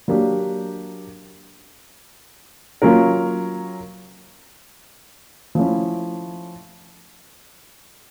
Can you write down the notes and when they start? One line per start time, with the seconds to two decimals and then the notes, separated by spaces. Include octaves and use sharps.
0.08 F#3 A#3 D4 G4
2.82 F#3 A#3 C#4 F4 A#4
5.55 F3 A3 C#4 E4